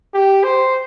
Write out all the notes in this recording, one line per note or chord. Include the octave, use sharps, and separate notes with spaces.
G4
C5